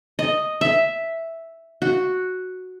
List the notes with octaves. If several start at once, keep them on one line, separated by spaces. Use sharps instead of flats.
D#5
E5
F#4